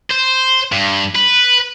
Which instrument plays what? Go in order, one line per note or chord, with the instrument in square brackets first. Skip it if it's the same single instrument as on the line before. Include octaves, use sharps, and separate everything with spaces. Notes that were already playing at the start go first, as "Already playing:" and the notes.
[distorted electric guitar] C5
G2
B4